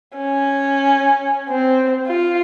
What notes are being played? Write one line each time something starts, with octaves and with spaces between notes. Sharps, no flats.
C#4
C4
F4